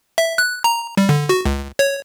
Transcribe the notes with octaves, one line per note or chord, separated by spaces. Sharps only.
E5
F#6
A#5
G3
D3
F#4
C#2
C#5